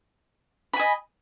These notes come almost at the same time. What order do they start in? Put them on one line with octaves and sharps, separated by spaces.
B5 G#5 D#5